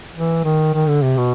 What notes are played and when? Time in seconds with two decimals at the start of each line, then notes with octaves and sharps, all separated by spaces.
0.15 E3
0.44 D#3
0.74 D#3
0.88 D3
1.02 C3
1.17 B2